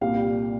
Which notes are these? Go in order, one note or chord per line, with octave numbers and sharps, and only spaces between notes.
C2 A#2 G3 F5